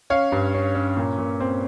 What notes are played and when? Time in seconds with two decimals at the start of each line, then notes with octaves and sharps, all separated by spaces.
0.10 C#4 C#5 F5
0.32 G2
0.54 C#4
0.75 C#4
0.97 A#2
1.18 A#2
1.40 C4